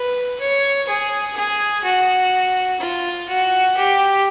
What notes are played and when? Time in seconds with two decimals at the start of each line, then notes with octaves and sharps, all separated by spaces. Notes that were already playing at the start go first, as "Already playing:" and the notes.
Already playing: B4
0.40 C#5
0.88 G#4
1.37 G#4
1.84 F#4
2.80 F4
3.28 F#4
3.77 G4